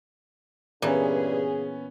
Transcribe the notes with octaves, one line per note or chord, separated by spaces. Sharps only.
G2 A#2 C#3 E3 B3 C#4 G#4